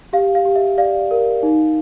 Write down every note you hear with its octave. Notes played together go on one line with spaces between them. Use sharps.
G4 F5
F5
G4
E5
D5 F5
A#4
D#4